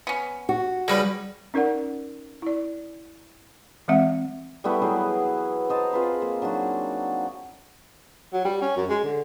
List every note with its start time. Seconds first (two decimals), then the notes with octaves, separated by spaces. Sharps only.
0.07 B3 C#4
0.49 F#4
0.88 C#3 G3 A#3 D#4 B4
1.54 C#4 D#4 A#4 D5 F#5
2.42 E4 D5
3.88 E3 G#3 C4 E5 F#5
4.64 G3 A3 B3 E4
4.82 E3 F#3 G#4 G5
5.69 C5 D#5 A5 A#5
5.93 C4 F4 G#4 B4
6.22 A#3
6.42 F#3 D4 D#4 F#4
8.33 F#3
8.45 G3
8.62 C#4
8.76 F#2
8.90 G#3
9.04 D3